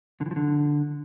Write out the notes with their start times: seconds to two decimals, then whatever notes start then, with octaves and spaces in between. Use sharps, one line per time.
0.21 D3
0.26 E3
0.31 F3
0.36 D3